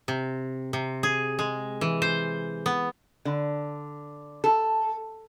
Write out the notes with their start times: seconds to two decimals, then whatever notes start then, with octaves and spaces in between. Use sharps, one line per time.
0.08 C3
0.73 C3
1.03 G#4
1.39 G#3
1.81 E3
2.02 C5
2.66 B3
3.25 D3
4.44 A4